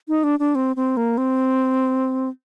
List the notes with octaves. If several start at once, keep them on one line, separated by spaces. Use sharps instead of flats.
D#4
D4
D4
C4
C4
A#3
C4